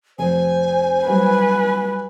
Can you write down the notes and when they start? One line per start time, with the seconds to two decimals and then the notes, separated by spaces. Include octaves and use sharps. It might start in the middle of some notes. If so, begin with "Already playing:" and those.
0.19 F1 C5 G#5
1.07 F#3 G3 B4